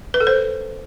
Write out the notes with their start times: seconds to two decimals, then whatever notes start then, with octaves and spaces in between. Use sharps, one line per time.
0.14 B4
0.20 A4
0.27 C5